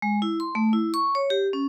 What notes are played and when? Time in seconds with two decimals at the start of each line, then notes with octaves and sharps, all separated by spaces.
0.02 G#3
0.22 E4
0.40 C6
0.55 A3
0.73 E4
0.94 C#6
1.15 C#5
1.30 G4
1.53 C#4